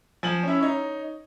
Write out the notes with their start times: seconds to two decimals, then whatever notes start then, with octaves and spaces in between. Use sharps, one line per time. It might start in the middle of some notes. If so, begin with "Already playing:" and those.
0.23 F3 G#5 F#7
0.43 C#4 E4
0.60 D#4 C#5